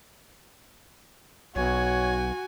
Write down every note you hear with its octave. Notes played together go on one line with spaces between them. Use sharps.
B1 F#4 C#5 G#5